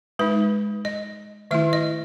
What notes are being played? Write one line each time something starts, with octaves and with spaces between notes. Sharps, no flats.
G#3 D#4 B4
D#5
D#3 A3 E4 E5
D#5